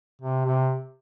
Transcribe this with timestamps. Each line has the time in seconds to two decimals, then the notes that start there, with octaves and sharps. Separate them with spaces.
0.22 C3
0.45 C3